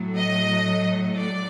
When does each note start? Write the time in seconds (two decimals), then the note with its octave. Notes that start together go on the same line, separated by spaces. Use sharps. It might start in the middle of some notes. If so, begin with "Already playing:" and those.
Already playing: A2 F#3 A3
0.16 D#5
1.16 D5